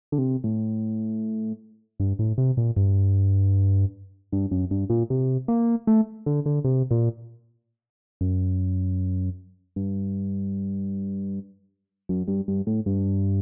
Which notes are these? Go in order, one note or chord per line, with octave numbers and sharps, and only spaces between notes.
D3
C3
A2
G2
A2
C3
A#2
G2
G2
F#2
G2
A#2
C3
A#3
A3
D3
D3
C3
A#2
F#2
G2
F#2
G2
G2
A2
G2